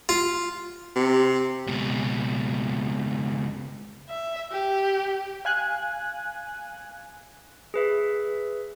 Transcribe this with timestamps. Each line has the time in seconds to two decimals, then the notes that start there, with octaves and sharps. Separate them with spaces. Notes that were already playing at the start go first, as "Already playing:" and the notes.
0.09 F4
0.96 C3
1.68 C#2 B2
4.09 E5
4.52 G4
5.45 F5 G#5 F#6
7.74 G#4 B4 E5